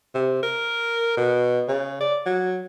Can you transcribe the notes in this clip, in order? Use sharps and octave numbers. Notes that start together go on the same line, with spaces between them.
C3
A#4
B2
C#3
D5
F#3